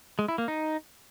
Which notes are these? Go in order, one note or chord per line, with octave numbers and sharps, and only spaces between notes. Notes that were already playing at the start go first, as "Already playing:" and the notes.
G#3
E4
A#3
D#4